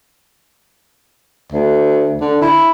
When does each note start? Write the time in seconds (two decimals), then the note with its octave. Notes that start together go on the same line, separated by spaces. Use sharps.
1.52 D2
2.20 D3
2.41 E4